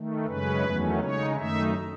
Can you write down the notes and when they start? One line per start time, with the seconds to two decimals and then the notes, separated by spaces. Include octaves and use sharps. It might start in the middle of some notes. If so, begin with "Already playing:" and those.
Already playing: D#3 A3
0.26 F#2 C#3 G#3 C#4 B4
0.63 E2 D#3 F#3 A3 C#4
1.00 C#3 G#3 D#4 C#5
1.37 F#2 D#3 A3 D#4 E5